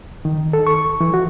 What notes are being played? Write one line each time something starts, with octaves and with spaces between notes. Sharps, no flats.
D#3
A4
C#6
E3
F#4